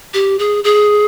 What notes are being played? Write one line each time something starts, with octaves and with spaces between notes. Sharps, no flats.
G4
G#4
G#4